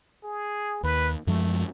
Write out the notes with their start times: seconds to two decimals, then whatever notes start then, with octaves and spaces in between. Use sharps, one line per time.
0.24 G#4
0.83 D#2 B4
1.27 F#2 F3 G#3 A3